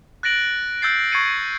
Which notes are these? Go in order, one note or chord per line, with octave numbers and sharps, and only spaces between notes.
F#6 A6 A#6 D7 F#7
E6 G6 A6 C7
C#6 G#6 A6 C7 C#7 D#7